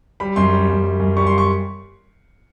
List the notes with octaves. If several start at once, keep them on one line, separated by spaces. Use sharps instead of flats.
G3 B5
F#2 C6
G3
F#2
F#2
F#2
G3 C#6
C6
C#6